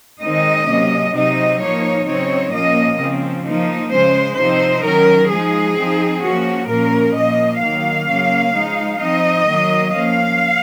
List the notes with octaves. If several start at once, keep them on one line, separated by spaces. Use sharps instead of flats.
D#3 G#3 C4 D#4 D#5
C3 F#3 A#3 C#4
C3 F#3 C4 D#4 D#5
A#2 F3 A#3 D#4 C#5
C#3 F#3 C4 D#4 C#5
A#2 F3 A#3 C#4 D#5
C#3 F3 C4
F3 A#3 D#4
C#3 G#3 C#4 C5
C3 F3 C4 D#4 C5
D#3 F#3 C#4 A#4
F3 G#3 D#4 G#4
F3 C4 D#4
F3 A#3 C#4 F#4
A#2 F3 A#3 C#4 A#4
A#2 F3 A#3 D#5
D#3 F#3 A#3 F5
C#3 F#3 A#3 C#4
F3 G#3 D#4
F3 C4 D#4 D#5
D#3 F#3 A#3
F3 A#3 C#4 F5